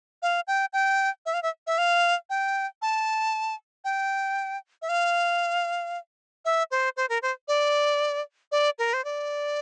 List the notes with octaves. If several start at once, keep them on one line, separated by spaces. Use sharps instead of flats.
F5
G5
G5
E5
F5
E5
E5
F5
G5
A5
G5
E5
F5
E5
C5
C5
A#4
C5
D5
D5
A#4
C5
D5